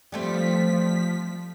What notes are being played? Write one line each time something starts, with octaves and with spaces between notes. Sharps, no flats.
F3 G3 A3 C4 B6